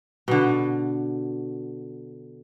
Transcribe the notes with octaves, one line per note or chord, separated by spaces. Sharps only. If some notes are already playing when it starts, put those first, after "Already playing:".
B2 D3